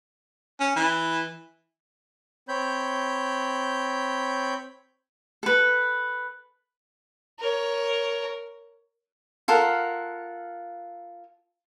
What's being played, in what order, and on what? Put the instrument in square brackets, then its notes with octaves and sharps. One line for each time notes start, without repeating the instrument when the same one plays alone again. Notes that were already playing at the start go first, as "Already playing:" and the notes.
[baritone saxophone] C#4
E3
[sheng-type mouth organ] C4 C#5 B5 G6
[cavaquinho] A4 B4
[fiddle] A#4 C#5
[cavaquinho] F4 A4 A#4 F#5